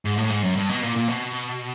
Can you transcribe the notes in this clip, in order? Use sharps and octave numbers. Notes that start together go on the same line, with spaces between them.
G#2
A2
G#2
F#2
G2
B2
A#2
A#2
B2